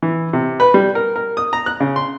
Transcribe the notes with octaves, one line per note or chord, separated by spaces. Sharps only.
E3
C3
B4
G3
A#4
A#4
D#6
A#5
F#6
C#3
C6